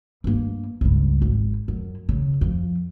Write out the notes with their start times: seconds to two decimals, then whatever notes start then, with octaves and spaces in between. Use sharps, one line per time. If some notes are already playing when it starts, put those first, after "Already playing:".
0.24 G2 A#3
0.81 C#2 G2
1.22 G#1
1.68 F#2
2.09 C#3
2.41 F2